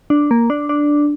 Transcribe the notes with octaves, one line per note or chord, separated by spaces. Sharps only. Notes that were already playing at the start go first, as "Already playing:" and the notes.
D4
A#3
D4
D4